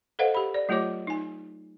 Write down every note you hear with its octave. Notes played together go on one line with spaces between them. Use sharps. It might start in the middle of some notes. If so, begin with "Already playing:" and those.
A4 B4 C5 D#5 F5 F#5
G4 B5
D5
F#3 A3 F4 G4 C#5 D6
D#4 G#5